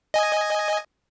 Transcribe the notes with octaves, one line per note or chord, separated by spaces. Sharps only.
D#5 G#5